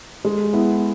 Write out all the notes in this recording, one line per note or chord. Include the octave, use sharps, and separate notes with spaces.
G#3
B3 E4